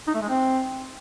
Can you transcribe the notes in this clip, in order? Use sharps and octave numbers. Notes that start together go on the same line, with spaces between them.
D#4
A3
G#3
C4